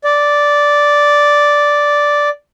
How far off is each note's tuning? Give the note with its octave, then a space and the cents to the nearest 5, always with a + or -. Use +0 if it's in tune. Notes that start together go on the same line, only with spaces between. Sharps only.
D5 -5